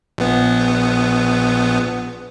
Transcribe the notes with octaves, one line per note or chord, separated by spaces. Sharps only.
A#1 B3